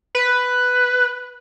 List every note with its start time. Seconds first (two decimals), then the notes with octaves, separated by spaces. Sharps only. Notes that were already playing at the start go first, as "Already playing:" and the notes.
0.15 B4